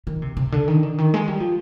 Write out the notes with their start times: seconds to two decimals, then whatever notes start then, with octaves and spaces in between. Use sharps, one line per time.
0.07 D#3
0.22 C3
0.37 C3
0.52 D3
0.68 D#3
0.83 D3
0.98 D#3
1.14 G#3
1.28 G3
1.40 F3